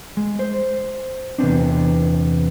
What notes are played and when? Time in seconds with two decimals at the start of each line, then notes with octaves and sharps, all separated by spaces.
0.17 G#3
0.39 C5
1.38 E2 C3 B3 C4 D4